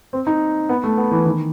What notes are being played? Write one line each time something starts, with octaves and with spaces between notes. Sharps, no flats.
C4
D#4
B3
A3
B3
E3
D#3